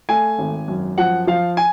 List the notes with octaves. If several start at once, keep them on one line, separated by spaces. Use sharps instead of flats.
A3 G#5
G#1
F#2
F3 F#5
F3 F5
G#5